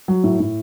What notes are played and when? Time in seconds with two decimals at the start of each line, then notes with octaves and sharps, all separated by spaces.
0.08 F#3
0.24 A2
0.40 A2